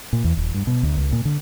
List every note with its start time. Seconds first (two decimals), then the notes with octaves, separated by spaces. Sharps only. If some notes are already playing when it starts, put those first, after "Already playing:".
0.13 A#2
0.24 E2
0.37 D#1
0.54 G2
0.67 B2
0.83 D2
0.97 C#2
1.13 A#2
1.25 D3